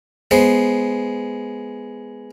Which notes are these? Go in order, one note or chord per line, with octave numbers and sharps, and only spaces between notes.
G#3 B3 C5